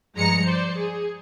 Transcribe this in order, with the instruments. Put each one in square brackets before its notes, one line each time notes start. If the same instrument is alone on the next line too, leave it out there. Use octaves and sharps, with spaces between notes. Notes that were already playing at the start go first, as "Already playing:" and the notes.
[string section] G2 F3 G#3 A#5 C#7
C5 D5
G#4